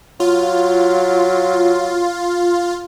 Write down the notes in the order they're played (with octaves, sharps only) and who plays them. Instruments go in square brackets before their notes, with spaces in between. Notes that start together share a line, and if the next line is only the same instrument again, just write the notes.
[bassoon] F#3 [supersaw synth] F4